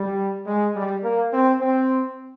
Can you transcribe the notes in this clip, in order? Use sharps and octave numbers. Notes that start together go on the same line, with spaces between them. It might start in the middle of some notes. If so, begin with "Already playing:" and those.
Already playing: G3
G#3
G3
A#3
C4
C4